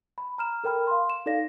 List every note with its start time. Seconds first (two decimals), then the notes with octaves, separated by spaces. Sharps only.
0.18 B5
0.38 A#5 F6 E7
0.64 A4 A#4 G5 B5 F6
0.87 F5 C6
1.10 E7
1.26 D#4 A4 D5 F5 A#6